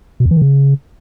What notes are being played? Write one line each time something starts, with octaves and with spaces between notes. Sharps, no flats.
B2
E2
E3
D#3
C#3